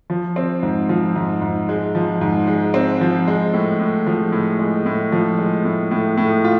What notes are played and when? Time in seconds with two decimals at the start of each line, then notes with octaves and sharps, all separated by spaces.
0.10 F3
0.36 C4
0.63 G#2
0.89 F3
1.16 G#2
1.41 G#2
1.69 G#3
1.95 F3
2.21 G#2
2.47 G#3
2.74 C4
3.01 F3
3.28 G#3
3.54 A2
3.80 A2
4.07 F3
4.32 A2
4.59 G#3
4.86 A2
5.12 F3
5.38 G#3
5.65 A2
5.91 A2
6.17 A2
6.44 F4